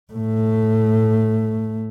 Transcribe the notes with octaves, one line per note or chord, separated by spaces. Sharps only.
A2 A3